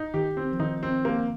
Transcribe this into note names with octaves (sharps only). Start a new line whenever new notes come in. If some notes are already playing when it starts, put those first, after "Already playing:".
Already playing: D#4
D#3 G4
C4
F3
D#3 D#4
C4
A#3